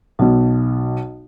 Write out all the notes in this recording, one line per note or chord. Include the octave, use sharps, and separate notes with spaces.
B1 B2